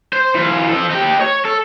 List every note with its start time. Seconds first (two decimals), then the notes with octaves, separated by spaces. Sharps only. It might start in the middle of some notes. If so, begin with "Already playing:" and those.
0.13 C5
0.35 E3 F4
0.69 F3 A4
0.90 D#4 G4
1.21 C#5
1.45 A4